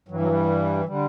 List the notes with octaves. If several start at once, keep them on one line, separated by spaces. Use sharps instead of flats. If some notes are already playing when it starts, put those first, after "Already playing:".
G2 E3 F#3
F#3
G3
D3 G3